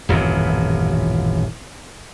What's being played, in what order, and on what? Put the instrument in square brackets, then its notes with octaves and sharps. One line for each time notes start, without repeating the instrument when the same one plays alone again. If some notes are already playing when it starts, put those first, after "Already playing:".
[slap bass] D#1 A1 F#2 C3